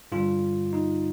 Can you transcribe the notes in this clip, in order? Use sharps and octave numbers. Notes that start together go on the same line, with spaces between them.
G2 D3 G3 F4
D#4